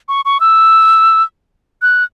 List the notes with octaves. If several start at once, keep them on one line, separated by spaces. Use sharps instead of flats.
C#6
C#6
E6
F#6